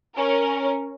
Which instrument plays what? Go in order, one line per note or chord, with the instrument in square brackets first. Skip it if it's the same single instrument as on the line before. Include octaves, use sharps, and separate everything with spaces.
[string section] C#4 A#4